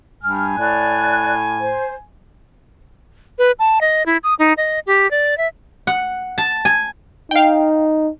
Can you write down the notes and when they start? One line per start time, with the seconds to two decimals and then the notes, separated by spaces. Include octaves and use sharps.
0.23 G2 G#5 F6
0.57 A2 D5 F#6
1.60 C5
3.39 B4
3.59 A5
3.81 D#5
4.06 E4
4.24 D#6
4.39 D#4
4.57 D#5
4.87 G4
5.11 D5
5.38 E5
5.87 F#5
6.38 A5
6.65 G#5
7.31 D#4 F5 G5